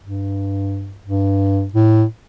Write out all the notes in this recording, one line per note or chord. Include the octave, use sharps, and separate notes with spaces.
G2
G2
A2